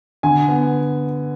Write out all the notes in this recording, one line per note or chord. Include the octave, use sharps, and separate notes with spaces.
D3 G#5
B3